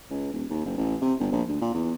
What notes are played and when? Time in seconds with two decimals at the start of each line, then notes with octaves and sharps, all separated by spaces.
0.10 C#2
0.33 D#1
0.50 D#2
0.65 F#1
0.77 A1
1.01 C3
1.20 G1
1.32 A#1
1.48 D2
1.61 A#2
1.74 E2